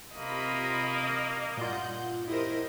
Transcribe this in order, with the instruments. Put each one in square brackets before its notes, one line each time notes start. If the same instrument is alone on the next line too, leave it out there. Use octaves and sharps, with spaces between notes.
[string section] C3 F4 B5 [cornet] A#3 [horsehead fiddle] D#5
[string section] G2 F#5 G6 [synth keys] A#2 F4
[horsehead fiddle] E4 A#4 [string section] G4 C5 D#5